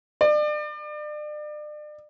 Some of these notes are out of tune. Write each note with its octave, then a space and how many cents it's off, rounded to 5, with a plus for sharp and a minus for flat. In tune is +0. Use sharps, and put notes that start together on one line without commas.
D5 +35